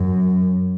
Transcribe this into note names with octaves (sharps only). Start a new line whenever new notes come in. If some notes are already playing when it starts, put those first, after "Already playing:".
Already playing: F#2